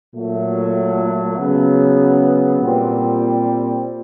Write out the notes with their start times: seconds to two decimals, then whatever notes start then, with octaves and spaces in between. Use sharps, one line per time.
0.14 A#2 F#3 A3
1.37 C#3 F#3 B3
2.62 A#2 G3 C4